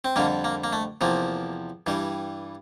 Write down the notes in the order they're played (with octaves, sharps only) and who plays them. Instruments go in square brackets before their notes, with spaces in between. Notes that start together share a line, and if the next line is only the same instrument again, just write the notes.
[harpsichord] C4
F2 D3 G3 A#3
A#3
A#3
A3
E2 C3 F3 A#3
G2 E3 G3